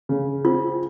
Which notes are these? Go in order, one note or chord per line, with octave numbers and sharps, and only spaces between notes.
C#3
C4 F4